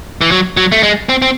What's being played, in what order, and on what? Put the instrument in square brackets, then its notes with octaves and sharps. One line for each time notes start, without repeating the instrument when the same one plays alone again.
[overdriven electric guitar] E3
F#3
F#3
A3
G#3
C4
C4